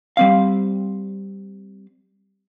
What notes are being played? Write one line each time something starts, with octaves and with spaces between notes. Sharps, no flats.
G3 C4 F5